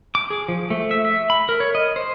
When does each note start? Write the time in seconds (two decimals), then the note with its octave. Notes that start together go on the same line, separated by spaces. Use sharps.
0.15 D6
0.30 G#4
0.49 F3
0.70 A3
0.91 E5
1.05 E5
1.30 B5
1.49 A#4
1.60 C#5
1.75 D#5
1.96 C5